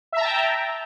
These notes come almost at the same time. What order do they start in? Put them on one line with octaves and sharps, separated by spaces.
E5 A#5 A5 G5